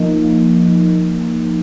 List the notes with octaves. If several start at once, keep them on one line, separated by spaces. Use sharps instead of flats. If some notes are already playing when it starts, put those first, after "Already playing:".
Already playing: F3 A#3 D#4